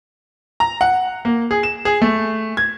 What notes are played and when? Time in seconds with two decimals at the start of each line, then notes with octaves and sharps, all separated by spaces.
0.60 A#5
0.81 F#5
1.25 A#3
1.51 G#4
1.63 E7
1.85 G#4
2.02 A3
2.57 G#6